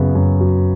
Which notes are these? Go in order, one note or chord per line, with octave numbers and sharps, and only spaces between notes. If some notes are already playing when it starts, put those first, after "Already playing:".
Already playing: F#2 C#3 B3
F#2
F#3